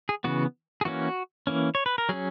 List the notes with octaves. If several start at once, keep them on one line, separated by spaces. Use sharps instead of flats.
G#4
C#3 E3 B3 F#4
G#4
E3 A#3 C#4 F#4
E3 A#3 C#4
C#5
B4
A#4
F#3 C#4 G#4